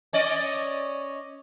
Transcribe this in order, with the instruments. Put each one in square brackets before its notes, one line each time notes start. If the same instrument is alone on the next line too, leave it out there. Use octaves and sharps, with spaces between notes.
[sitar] C#4 D5 D#5